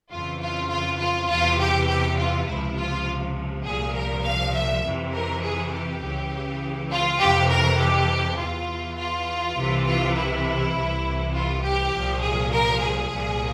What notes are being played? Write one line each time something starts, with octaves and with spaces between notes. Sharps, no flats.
F2 C#3 E3 F4
F4
F4
F4
E2 C3 E3 F4
G4
G4
F4
C#2 C3 F3 E4
F4
C2 A#2 F3 G#4
A#4
F5
E5
F2 C3 E3
A#4
G#4
G4
C#2 C#3 E3
F4
F2 C3 E3 G4
A#4
G4
E2 E3 F4
F4
C2 C3 E3
F4
E4
C2 C3 E3
F4
G4
C2 A#2 F3
G#4
A#4
G#4
C2 A#2 F3